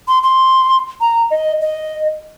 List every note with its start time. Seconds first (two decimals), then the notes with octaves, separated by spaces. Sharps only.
0.08 C6
0.23 C6
1.01 A#5
1.31 D#5
1.61 D#5